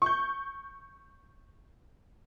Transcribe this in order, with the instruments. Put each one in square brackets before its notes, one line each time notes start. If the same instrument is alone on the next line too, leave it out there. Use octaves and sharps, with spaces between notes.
[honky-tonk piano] C#6 G6